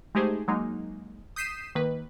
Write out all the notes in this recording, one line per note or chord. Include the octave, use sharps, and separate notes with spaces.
G#3 A3 D#4 G4 G#4 C5
F#3 G#3 A#3 D#4
D#6 G6 B6 C7 D#7 E7
D#3 A#3 B4